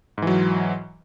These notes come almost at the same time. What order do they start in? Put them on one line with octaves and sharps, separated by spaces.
G#2 E3 F#3